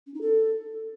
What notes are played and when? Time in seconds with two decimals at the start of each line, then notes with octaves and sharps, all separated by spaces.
0.06 C#4
0.14 D#4
0.21 A4